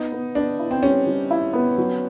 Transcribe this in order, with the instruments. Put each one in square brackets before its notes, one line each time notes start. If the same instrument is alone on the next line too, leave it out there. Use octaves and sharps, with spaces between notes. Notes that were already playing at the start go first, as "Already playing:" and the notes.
Already playing: [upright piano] B3 [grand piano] D#4
[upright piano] B3
[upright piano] B3 [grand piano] D4
[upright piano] E4
[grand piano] C4
[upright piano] G3 [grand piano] C#4
[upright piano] G3
E4
B3
F#3